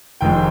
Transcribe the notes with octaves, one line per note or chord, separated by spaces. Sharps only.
F1 F2 D#3 G#3 G5